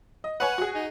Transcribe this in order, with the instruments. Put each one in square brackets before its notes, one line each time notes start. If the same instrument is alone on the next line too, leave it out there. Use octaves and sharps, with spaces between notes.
[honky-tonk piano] D#5
[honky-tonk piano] B4 C#5 G#5 [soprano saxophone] F#5
[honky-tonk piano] F#4 G#4
[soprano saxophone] D#4